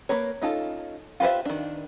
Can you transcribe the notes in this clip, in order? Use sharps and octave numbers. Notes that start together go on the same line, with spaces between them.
A#3 A#4 B4 C#5
C#4 D#4 F4 A4
F4 G4 B4 C5 E5
D#3 D4